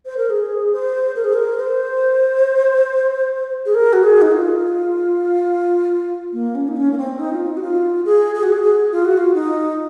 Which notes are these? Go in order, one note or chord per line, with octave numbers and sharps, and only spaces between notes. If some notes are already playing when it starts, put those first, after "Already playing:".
C5
A#4
G#4
C5
A#4
G#4
A#4
C5
G#4
A#4
F#4
G#4
D#4
F4
A#3
C#4
D#4
C#4
A#3
C4
D#4
F4
D#4
F#4
F4
G#4
G#4
F#4
G#4
G#4
F4
F#4
F4
D#4